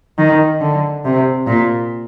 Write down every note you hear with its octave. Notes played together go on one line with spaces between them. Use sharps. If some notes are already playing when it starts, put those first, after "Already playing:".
D#3
D3
C3
A#2